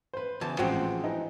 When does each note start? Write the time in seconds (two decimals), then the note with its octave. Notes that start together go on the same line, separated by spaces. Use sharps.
0.14 B4 C5
0.41 E2 C#3 A5
0.59 A1 F3 G#3 C4 F#4 G5
1.04 E3 D#4